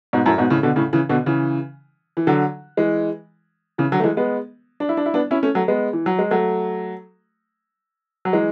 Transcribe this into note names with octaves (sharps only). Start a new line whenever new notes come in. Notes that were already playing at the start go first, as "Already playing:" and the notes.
G#2 B2
F#2 A2
G#2 B2
A2 C#3
B2 D3
A2 C#3
C#3 E3
B2 D3
C#3 E3
E3
D3 F#3
E3 G#3
C#3 E3
D3 F#3
A3
E3 G#3
G#3 B3
D4
E4
D4
E4
B3 D4
C#4 E4
A3 C#4
F#3 A3
G#3 B3
E3
F#3
G#3
F#3 A3
F#3
E3 G#3